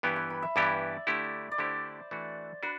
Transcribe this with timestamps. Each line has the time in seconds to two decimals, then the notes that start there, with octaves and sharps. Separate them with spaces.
0.03 G2 E3 B3 E4 G4 C6
0.16 C6
0.30 B5
0.42 E5
0.56 G2 E3 B3 E4 G4 D5
1.07 D3 A3 E4 G4
1.51 D5
1.58 D3 A3 E4 G4 C5
2.11 E3 A3 D4 F#4
2.63 D4 F#4 B4